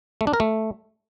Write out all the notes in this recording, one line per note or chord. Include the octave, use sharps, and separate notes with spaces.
A3
D4
A#4
A3